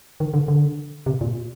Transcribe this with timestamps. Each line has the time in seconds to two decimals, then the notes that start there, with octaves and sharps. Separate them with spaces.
0.20 D#3
0.34 D3
0.48 D3
1.06 C3
1.21 A#2